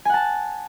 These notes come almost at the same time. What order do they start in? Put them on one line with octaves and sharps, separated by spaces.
G#5 F#5 A5